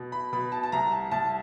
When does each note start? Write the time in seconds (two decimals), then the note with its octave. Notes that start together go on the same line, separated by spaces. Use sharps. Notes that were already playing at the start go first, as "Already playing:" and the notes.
Already playing: B2
0.12 B5
0.33 B2 B5
0.52 A5
0.63 A5
0.72 C2 A#5
0.92 A5
1.11 C2 A5